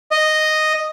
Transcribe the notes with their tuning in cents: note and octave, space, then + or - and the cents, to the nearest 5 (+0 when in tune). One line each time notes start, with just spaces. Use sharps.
D#5 -5